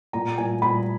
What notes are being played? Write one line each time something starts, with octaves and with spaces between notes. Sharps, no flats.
A#2 A#5
A#2 G#5
A#2 B5